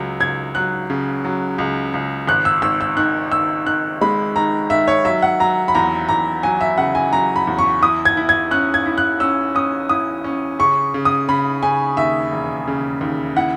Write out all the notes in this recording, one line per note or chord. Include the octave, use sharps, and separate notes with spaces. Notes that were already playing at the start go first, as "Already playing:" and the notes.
Already playing: C#2 F#3
C#2 G#6
F#3 F#6
C#3
F#3
C#2
C#2
G#1 F#6
E6
G#1 E6
E6
D#3 F#6
D#3 E6
D#3 F#6
G#3 B5
D#3 A#5
D#3 E5
C#5
F#3 E5
F#5
F#3 A#5
B5
E2 A#5
E2 A#5
F#3 G#5
E5
C#3 F#5
G#5
F#3 A#5
B5
E2
C#6
E4 D#6
G#6
E4
G#6
C#4 F#6
G#6
E4
F#6
C#4 E6
C#4 D#6
E4 D#6
C#4
C#3 C#6
C#3
D#6
C#3 B5
C#3 G#5
D#2 E5
E1
C#3
D#2
E4 F#5